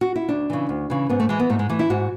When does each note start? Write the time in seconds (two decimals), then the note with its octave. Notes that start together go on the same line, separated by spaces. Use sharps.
0.01 F#4
0.16 E4
0.29 D2 D4
0.50 C#3 E3
0.69 D2
0.90 C#3 E3
1.09 G#2 B3
1.20 A3
1.29 E3 G#3
1.40 B3
1.50 G#2 A3
1.59 G#3
1.69 E3 A3
1.79 E4
1.90 G#2 F#4